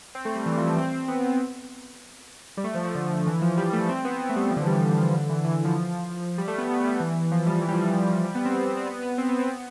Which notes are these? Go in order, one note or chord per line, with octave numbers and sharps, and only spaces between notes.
C4
A3
G3
E3
F3
A3
C4
B3
B3
G3
A3
F3
F3
D3
E3
F3
G3
A3
C4
B3
B3
A3
G3
F3
D3
E3 G3
F3
G3
F3
D3
E3
E3
E3
F3
G3
A3
B3
B3
G3
E3
F3
G3
E3
G3
F3
G3
F3
F3
G3
B3
C4
C4
B3
B3
C4
B3
C4
B3